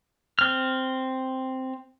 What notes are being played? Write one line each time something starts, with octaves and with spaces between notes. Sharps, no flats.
C4 F6